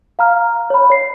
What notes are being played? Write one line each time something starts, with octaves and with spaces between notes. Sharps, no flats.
F5 A#5 F6
C#5 B5
C#5 C7